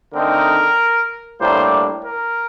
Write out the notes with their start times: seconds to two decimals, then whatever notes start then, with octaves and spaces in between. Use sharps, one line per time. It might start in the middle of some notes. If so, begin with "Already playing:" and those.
0.14 D3 A3 C4 D#4 A#4
1.41 A2 G3 A#3 D4 C5
2.05 A#4